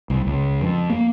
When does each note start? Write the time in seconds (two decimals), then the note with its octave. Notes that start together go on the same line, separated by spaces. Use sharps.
0.10 C2
0.27 C#2
0.61 F2
0.90 A#3